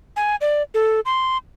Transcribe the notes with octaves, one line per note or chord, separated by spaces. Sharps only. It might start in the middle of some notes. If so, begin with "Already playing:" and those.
G#5
D5
A4
C6